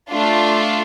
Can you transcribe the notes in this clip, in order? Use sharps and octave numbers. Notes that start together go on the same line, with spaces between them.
A3 D4 F4